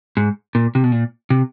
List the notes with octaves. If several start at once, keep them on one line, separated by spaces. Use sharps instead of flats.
G#2
A#2
C3
B2
A#2
C3